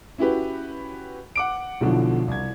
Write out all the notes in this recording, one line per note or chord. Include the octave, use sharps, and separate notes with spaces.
C#4 E4 F#4 G4 B4
F#5 D6 D7
B1 B2 D3 E3 F3
C2 G#6